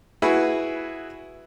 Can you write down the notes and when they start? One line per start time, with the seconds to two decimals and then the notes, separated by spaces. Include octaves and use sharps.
0.22 E4 F#4 G#4 B4